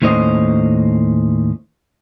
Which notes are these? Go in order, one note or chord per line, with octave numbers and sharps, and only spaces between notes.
D#2 A2 C#4 C5 D#5